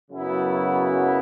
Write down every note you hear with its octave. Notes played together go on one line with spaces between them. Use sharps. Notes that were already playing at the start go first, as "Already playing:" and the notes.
F#2 C#3 F#3 B3 E4